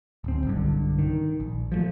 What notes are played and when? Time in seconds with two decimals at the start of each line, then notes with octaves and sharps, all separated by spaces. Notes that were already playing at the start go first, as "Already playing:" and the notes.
0.24 D1 C4
0.45 B1 G2 D3
0.99 D#3
1.40 A#1
1.72 F3 F#3 A3